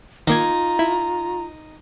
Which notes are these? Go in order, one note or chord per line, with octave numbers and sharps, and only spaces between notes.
D#3 A#3 D#4 F4 A#5 G#6
E4